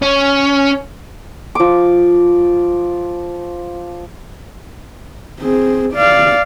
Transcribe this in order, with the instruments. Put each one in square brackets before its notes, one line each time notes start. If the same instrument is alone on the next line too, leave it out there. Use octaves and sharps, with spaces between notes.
[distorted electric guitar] C#4
[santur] F3 D6
[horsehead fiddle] C4 G#4
D5 F5